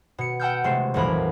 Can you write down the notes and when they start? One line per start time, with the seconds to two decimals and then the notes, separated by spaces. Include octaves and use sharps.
0.18 B2 C#7
0.40 F#5 G5 A5 E6 F6 G6
0.64 E1 C3 G#3 A3 C7 E7
0.94 D#1 B1 F2 E3 A#4 B5